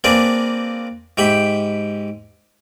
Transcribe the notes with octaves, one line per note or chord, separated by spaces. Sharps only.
A#3 C4 D4 G#4 B4 D5
G#2 G4 E5 G5 B5